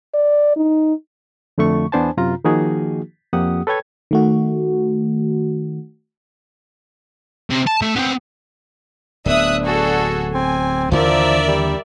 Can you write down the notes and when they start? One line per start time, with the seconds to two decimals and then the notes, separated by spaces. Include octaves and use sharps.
0.14 D5
0.56 D#4
1.58 F2 D3 A3 C#6
1.92 E2 B3 D4 C5 G#5 A5
2.17 F#2 C3 F4 A#5
2.45 D#3 F3 A#3 D#4 F#4 G#4
3.33 F2 A#3 G4 F#5 D#6
3.67 A4 B4 C#5 G5 G#6
4.11 D#3 A3 F#4
7.50 C3
7.67 A5
7.82 A3
7.96 B3 C4
9.26 D1 B3 D4 E5 D#6 F#6
9.65 F#4 G#4 A4
10.34 C4 G#5
10.92 D#2 D3 E3 F3 A#4 D5 E5
11.47 G3